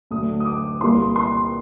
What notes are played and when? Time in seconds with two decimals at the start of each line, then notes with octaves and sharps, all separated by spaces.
0.11 D2 D3 F#3 D#6
0.40 D#6
0.46 D6
0.81 C2 A#2 G3 A#3 C6
1.16 C6